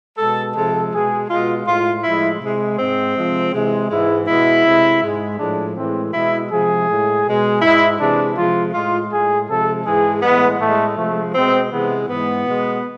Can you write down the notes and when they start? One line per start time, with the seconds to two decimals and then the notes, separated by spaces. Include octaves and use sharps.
0.18 B2 G#3 A4
0.55 C3 F3 G#3 A4
0.92 B2 G#3 G#4
1.29 B2 G#3 F4
1.66 A2 G#3 F4
2.03 A2 F3 G#3 E4
2.41 C3 G#3
2.78 G#2 G#3 C4
3.15 C3 F3 G#3
3.52 C3 E3 G#3
3.90 G#2 E3 G#3 E4
4.27 B2 G#3 E4
4.64 C3 G#3
5.01 G#2 G#3
5.38 A2 F3 G#3 D4
5.76 A2 E3 G#3 C4
6.13 B2 G#3 E4
6.50 C3 F3 G#3 G#4
6.88 A2 G#3
7.24 B2 G#3
7.62 G#2 G#3 E4
7.99 C3 E3 G#3 D4
8.36 C3 F3 G#3 F4
8.73 A2 G#3 F4
9.11 A2 G#3 G#4
9.48 C3 F3 G#3 A4
9.85 G#2 E3 G#3 G#4
10.22 A2 E3 G#3 B3
10.59 A2 G#3 A3
10.96 C3 F3 G#3 A3
11.34 B2 G#3 C4
11.71 C3 E3 G#3 B3
12.08 G#2 E3 G#3 B3
12.46 B2 G#3